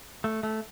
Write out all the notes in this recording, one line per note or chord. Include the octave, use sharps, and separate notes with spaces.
A3
A3